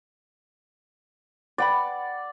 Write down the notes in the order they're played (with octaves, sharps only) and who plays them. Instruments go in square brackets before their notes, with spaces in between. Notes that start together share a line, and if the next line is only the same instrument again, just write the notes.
[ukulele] B4 G5 B5 [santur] D5 F#5